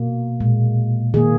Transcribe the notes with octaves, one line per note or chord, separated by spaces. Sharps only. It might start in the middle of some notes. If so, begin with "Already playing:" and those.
Already playing: B2 A#3
A#2 G#3
D#3 A#3 G#4